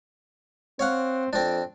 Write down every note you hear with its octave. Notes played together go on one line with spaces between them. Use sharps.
C4 C#5 F5 F#5
F2 C4 D4